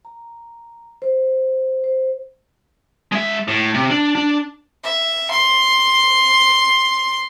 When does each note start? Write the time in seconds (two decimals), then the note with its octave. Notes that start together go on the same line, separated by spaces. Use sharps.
0.05 A#5
1.02 C5
1.84 C5
3.12 G#3 E5
3.48 A2
3.74 C3
3.90 D4
4.15 D4
4.84 E5
5.31 C6